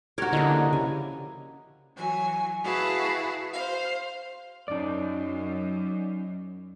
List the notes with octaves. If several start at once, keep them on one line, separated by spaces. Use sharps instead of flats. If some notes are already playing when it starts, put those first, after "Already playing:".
F#4 G4 A#4 C#5
D3 F3 A#3 C#4 E4 D#5
C#3 C#4 G4 G#5
E3 F#3 G#5
E4 F#4 G#4 B4 F5 A5
C5 F5
F#2 D#4 D5